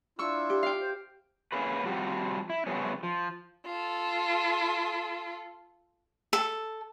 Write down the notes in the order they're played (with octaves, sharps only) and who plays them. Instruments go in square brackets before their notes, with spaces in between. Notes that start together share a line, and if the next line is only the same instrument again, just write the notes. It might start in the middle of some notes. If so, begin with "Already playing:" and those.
[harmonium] D4 E4 F4 [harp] C#6 E6
[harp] G4
F5 G5
[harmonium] C5
[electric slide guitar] A#3 C#4 G#4 B4
F3 G3 C4 F#4 G4
E4
C#3 F3 G3 A3 B3 C#4
F3
[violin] F4 A4
[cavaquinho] A4